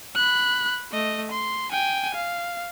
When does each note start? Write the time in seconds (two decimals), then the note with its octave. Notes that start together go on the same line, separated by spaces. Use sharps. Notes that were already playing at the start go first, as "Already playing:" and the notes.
0.15 B5 F#6
0.92 A3 D#5
1.32 C6
1.72 G5 G#5
2.15 F5